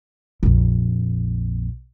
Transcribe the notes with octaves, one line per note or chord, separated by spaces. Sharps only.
A#1 F2